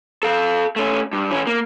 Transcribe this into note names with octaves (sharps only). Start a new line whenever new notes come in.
A4 F5
A3 C#4
G2
E3 C#4
A#3